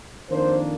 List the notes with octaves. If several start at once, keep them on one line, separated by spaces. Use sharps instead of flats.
F2 D#3 A#3 D4 C5